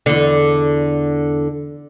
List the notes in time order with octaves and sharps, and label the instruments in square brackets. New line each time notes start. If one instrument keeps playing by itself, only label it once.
[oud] E2 D3